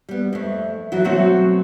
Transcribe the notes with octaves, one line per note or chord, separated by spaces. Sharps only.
G3 B3
F2 A3
E3 F#3 F#4
B2 F#3 A3 C4 F#4 F#5